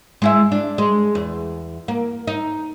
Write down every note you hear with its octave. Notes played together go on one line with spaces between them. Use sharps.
G#3 E4 E5
D4
G#3
E2
A#3
D#4